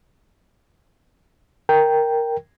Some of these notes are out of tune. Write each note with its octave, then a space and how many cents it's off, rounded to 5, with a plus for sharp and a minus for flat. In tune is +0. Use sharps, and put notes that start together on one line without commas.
A#4 +0 G5 +0